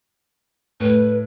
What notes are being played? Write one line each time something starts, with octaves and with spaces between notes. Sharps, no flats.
A2 B4